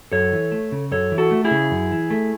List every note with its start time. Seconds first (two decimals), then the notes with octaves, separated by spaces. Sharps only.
0.12 F#2 A4 C#5
0.32 E3
0.52 A3
0.72 C#3
0.91 F#2 A4 C#5
1.12 E3
1.18 F#4 A4
1.31 A3
1.44 E4 G#4
1.51 C#3
1.71 F#2
1.91 E3
2.10 A3